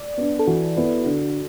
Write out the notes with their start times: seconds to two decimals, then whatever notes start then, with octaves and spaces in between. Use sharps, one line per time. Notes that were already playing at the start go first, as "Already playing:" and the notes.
Already playing: D5
0.18 B3 D4
0.39 A4
0.47 E3 F#4
0.77 B3 E4
1.06 D3